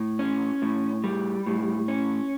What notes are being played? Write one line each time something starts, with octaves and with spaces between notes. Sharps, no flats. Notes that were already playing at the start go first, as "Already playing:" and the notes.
Already playing: A2
C#4
A2
G3
A2
C#4